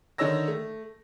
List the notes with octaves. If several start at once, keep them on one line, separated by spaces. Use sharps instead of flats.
D3 D#3 D#4 C#5 E6 A#6
A3